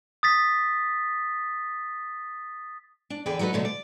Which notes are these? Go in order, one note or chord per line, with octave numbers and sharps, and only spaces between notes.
D#6 A6 B6
D4
E2 D3 G#4 B4 D5 G5
F#3 D#4 F#4 A4 B4
B2 D3 F#3 A3
D5